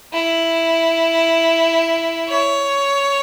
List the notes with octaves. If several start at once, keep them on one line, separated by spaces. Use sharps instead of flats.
E4
C#5